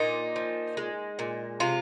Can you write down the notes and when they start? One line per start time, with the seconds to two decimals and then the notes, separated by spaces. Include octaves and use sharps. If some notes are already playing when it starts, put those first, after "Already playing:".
Already playing: A#2 D#4
0.36 F3
0.77 G#3
1.19 A#2
1.60 C3 F4